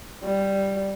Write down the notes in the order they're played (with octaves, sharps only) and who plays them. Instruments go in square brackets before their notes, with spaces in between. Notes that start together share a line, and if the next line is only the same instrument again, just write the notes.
[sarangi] G3